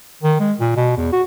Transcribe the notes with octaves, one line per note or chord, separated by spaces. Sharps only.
D#3
G#3
A#2
B2
E2
F#4